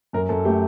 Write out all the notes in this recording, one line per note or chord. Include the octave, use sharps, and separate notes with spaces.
F#2 A#4
F#2 A4
A3 G4